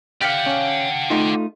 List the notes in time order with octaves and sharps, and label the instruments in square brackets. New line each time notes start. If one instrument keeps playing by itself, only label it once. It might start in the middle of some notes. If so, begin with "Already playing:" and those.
[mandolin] G4 F5 [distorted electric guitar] D5 F#5
[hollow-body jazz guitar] C#4
A3 D#4 F4